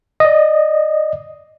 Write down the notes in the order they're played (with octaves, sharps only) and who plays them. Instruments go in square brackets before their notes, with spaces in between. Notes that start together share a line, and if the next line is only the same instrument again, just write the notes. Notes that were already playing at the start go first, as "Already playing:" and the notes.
[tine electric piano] D5 D#5